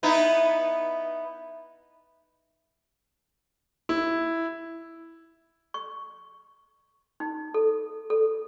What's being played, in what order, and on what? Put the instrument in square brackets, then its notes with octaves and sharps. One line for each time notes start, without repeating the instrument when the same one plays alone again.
[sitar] B3 D#4 E4
[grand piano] E4
[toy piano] C#6
D#4
A4
A4